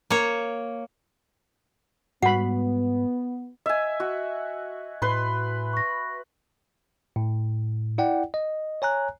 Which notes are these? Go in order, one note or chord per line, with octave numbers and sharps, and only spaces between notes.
A#3 C#5
G#2 G3 G#3 B3 F#4 F#5 B5
D#5 E5 G#5
F#4
A2 B4 C6
C#6 A#6
A2
E4 D5 F#5 G5
D#5
C#5 G#5 A#5 F#6